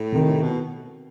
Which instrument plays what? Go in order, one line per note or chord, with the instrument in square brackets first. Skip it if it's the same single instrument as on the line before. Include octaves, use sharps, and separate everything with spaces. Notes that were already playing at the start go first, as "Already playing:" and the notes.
Already playing: [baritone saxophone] A2
[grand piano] C3 D#3
[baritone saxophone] B2